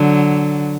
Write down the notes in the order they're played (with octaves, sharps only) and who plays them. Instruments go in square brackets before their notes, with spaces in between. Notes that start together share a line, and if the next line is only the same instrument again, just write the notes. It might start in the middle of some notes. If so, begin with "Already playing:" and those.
Already playing: [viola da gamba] D3 F#3